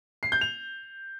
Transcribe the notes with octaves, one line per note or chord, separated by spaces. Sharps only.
C7
G6
F7